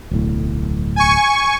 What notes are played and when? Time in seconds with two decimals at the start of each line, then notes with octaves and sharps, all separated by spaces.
0.11 D1 B1 A2
0.96 G#5 C#6